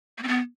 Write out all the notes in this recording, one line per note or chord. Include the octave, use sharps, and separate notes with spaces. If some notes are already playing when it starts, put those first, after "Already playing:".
A#3
C4
B3